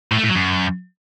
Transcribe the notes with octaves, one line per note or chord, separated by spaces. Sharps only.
A2
A3
A2
F#3
F#2